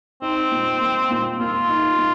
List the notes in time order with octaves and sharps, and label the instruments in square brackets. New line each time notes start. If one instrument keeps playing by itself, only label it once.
[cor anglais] C4 [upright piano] D#4
[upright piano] A#2
A#3
A#2
[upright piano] A#3 [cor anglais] F4
[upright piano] D#4
A#2